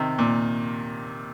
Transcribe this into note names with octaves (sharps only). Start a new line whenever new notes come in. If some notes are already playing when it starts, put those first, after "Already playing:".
Already playing: C3 D#3
A#2